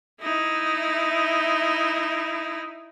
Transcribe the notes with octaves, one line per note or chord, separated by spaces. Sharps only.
D#4 E4